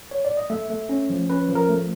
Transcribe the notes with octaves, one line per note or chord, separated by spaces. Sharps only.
C#5
D5
D#5
A3 E5
A3
C#4
F3
C#4 B4
F3
A#4
A3